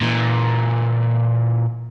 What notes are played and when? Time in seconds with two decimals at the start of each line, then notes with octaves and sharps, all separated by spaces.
0.01 A#2 E3